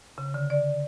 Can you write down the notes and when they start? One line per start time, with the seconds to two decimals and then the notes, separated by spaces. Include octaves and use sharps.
0.18 C#3
0.34 D3
0.50 D5